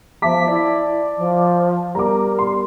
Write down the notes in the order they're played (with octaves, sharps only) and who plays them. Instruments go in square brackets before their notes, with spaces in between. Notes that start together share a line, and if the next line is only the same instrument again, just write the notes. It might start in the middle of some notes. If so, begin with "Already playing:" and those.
[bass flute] F3 [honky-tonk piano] E5 A5 D6 [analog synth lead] B6
[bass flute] E4 [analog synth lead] D5
[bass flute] F3
[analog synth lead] G3 [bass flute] A#4 [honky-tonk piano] A#5 D6
[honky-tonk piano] C6